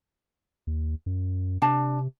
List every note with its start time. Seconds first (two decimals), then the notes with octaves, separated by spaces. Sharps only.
0.67 D#2
1.06 F#2
1.62 C3 D4 A5